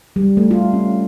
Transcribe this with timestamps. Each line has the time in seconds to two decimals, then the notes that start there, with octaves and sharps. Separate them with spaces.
0.16 G3
0.37 A3
0.51 F4
0.73 C#4